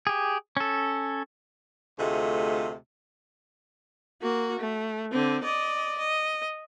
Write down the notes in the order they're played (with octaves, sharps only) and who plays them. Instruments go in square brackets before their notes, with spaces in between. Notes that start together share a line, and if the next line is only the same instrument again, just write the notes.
[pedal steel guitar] G4 G#4
C#4 A4
[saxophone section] D2 C3 A3 F4 G#4 D#5
[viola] A#3 F#4
A3
D3 C4
D5 D#5
D#5